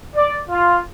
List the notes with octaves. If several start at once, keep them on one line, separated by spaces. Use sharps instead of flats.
D5
F4